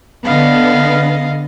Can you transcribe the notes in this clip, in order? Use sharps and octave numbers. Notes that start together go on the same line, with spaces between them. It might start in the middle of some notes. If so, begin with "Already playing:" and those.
D3 B3 D#5 F5